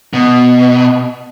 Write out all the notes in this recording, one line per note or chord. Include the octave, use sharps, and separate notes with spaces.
B2